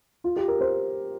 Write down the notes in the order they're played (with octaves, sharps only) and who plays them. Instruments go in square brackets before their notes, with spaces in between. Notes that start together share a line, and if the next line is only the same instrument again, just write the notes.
[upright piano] F4
G4
A#4
C5